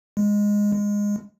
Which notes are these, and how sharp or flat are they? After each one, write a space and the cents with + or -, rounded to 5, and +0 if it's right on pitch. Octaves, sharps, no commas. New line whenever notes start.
G#3 -10
G#3 -15